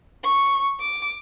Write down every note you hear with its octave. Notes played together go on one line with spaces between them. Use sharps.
C#6
D6